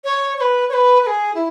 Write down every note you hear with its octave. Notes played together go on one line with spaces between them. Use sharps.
C#5
C#5
B4
C#5
B4
B4
G#4
E4